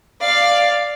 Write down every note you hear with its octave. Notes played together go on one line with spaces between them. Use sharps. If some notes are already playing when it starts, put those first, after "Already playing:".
D5 F5